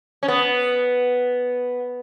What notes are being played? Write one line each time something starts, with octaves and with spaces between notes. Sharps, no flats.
C#4
B3